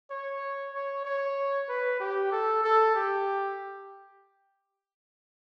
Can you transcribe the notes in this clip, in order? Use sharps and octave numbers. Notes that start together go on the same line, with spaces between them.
C#5
C#5
C#5
B4
G4
A4
A4
G4